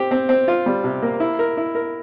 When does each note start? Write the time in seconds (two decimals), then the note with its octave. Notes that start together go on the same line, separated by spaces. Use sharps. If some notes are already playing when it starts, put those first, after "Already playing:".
Already playing: C4 G4
0.11 C4
0.29 C4
0.48 F4
0.66 G3
0.84 C3
1.02 A#3
1.20 E4
1.39 A#4
1.57 E4
1.75 A#4